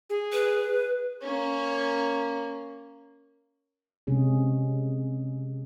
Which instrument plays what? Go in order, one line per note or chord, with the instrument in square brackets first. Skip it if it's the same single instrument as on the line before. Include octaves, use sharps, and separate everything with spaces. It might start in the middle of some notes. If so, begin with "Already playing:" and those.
[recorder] G#4
[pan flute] B4
[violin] A#3 C#4
[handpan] C3 G#3 C#4 G#4